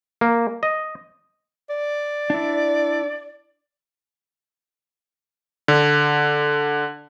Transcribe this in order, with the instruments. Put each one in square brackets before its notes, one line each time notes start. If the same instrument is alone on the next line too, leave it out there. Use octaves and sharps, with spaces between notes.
[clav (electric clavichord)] A#3
D#5
[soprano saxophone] D5
[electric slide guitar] D4 E4
[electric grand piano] D3